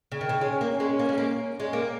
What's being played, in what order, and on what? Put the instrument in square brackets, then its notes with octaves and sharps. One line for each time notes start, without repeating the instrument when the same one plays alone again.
[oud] C#3
D#3
C#3
[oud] G#3 [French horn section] C#4
[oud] A#3
[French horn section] C#4
[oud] G#3
A#3
G#3
A#3
[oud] G#3 [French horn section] C#4
[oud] A#3